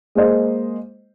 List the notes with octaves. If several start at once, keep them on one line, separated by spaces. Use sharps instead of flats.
G#3 A#3 C5 D#5